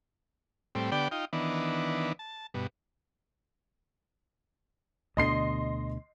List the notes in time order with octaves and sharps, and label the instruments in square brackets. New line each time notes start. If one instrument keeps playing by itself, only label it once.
[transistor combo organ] A2 G3 C4
D3 B3 G4 D5 G5
D#4 F4 G5
D#3 E3 B3 D4
A5
G2 B2
[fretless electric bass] D2 B2 D3 [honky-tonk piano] D#5 C6 C7